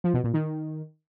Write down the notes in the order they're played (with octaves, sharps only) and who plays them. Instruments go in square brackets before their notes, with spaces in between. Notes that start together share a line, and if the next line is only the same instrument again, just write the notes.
[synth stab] F3
B2
A#2
D#3